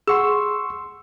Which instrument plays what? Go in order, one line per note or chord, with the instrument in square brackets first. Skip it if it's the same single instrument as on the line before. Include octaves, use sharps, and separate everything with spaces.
[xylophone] G#4 F#5 [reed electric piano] C6 C#6 E6